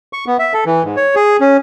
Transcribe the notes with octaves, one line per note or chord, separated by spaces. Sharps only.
C#6
B3
E5
A4
E3
G#2
C#5
G#4
C#4